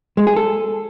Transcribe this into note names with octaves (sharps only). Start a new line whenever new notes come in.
G#3
G#4
A4